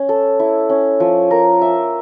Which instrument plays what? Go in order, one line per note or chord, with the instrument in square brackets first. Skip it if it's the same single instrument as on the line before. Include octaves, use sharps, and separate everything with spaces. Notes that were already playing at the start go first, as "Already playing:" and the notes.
Already playing: [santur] C#4
A4
E4
C#4
F3
A#4
E5